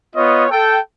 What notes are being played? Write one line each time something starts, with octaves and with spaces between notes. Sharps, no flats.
B3 F4 C#5 D#5
A4 G5